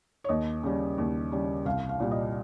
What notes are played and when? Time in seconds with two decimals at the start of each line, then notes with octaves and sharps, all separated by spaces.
0.24 C#5
0.29 D#2 D#5
0.63 C#3 G3
0.98 D#2
1.32 C#3 G3
1.65 C2 F5
1.89 F5
2.00 A#2 G3
2.11 D#5